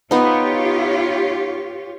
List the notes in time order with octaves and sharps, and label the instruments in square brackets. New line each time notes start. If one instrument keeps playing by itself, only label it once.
[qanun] B3 D#4 [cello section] F4 G4 C#5